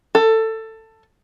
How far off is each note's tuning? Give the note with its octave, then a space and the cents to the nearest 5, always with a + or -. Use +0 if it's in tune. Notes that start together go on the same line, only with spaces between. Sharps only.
A4 +15